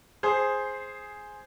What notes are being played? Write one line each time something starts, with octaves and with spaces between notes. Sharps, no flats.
G#4 C5